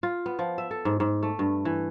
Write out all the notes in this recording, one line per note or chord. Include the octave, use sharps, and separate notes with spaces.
F4
B3
F3
E5
A4
G#2
G#2
A3
G2
E3